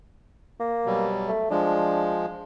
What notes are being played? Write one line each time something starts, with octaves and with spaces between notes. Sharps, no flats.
A#3
B2 F#3 G3
A3
F3 G#3 D4